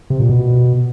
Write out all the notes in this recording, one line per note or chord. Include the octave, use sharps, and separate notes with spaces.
C3
A#2
B2